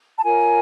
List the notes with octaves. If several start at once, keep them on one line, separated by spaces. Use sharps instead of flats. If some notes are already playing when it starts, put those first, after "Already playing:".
A5
F4 A#4 C#5 G#5